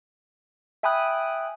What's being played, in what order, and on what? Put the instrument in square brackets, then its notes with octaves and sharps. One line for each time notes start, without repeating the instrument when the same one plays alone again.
[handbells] E5 G5 G#5 B5 D#6 F#6